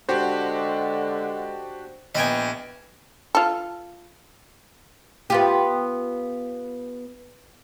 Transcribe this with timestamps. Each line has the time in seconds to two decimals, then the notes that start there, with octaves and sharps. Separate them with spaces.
0.09 D3 G#3 D4 F#4 G4 C5
2.15 A#1 B3 D#5 G5 G#5
3.35 F4 A4
5.30 B3 F4 G4